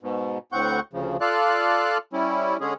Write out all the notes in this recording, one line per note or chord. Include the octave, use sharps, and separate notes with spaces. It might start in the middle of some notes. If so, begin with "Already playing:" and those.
G#2 B2
D2 A2 C4 F#5 C#6 G6
D2 C#3 F3
F4 A4 D5 F5 F#6
G3 C#4 E4
D3 G#3 C#4 G#4